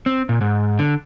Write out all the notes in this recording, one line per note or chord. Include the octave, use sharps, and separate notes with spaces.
C4
A#2
G#2
D3